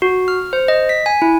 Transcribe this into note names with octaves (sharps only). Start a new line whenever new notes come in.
F#4
F6
C5
D#5
B6
G#5
E4